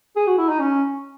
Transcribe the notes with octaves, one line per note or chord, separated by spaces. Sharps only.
G#4
F#4
E4
D#4
C#4